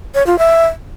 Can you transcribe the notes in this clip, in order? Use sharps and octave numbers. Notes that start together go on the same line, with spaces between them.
C#5
F4
E5